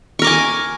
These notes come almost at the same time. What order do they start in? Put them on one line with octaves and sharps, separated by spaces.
C#6 A#4 D6 G#5